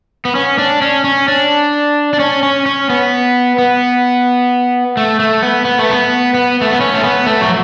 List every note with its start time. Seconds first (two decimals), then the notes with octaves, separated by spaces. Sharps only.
0.25 B3
0.35 C#4
0.58 D4
0.82 C#4
1.04 C#4
1.28 D4
2.13 D4
2.19 C#4
2.43 C#4
2.66 C#4
2.90 B3
3.58 B3
4.97 A3
5.20 A3
5.43 B3
5.65 B3
5.79 A3
5.91 B3
6.34 B3
6.61 A3
6.71 B3
6.80 C#4
6.94 A3
7.04 B3
7.26 A3
7.41 F#3